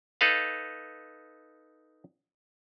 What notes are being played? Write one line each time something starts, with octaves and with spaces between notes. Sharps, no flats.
D#4 A4 B4 F5